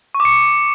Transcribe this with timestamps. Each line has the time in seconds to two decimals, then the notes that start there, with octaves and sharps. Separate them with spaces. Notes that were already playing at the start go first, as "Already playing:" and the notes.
0.14 C#6
0.20 D6
0.25 C#7